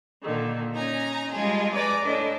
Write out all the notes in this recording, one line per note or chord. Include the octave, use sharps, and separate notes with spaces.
A#2 D3 D#3
C#4 D#4 G#5 A#5
G3 G#3 F4 G#4 A4
B4 D5 G#5 A#5 D6
A2 D4 D#5